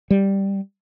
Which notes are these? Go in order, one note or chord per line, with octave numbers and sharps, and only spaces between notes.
G3